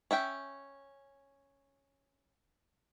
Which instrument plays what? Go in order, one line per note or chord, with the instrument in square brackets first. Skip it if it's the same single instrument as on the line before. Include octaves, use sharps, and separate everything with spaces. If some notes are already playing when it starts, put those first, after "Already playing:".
[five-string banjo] C#4 E5 G5